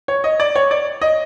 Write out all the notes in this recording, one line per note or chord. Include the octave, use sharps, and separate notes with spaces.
C#5
D#5
D5
C#5
D5
D#5